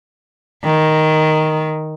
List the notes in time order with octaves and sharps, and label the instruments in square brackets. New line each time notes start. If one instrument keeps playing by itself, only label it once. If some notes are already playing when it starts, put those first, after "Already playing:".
[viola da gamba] D#3